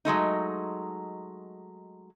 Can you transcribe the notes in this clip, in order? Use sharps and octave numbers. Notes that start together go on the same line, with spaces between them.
F#3 G#3 A3 D#4